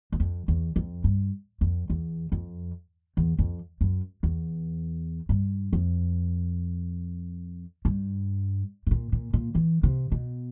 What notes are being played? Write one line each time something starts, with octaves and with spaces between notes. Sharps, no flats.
F#2
F2
E2
F2
G2
F2
E2
F2
E2
F2
F#2
E2
G2
F2
G2
A2
A#2
A#2
A#2
E3
C3
B2